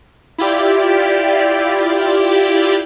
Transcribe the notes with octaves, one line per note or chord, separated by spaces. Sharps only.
E4 F4 G4 D5